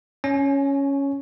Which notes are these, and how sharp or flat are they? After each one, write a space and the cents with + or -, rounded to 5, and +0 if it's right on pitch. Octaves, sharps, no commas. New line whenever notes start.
C#4 +0 C#5 +0 G#5 +25